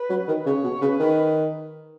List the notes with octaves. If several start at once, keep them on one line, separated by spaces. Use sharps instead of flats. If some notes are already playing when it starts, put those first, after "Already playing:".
Already playing: B4
F#3
D#3
C#3 C#5
B2
C#3 B4
D#3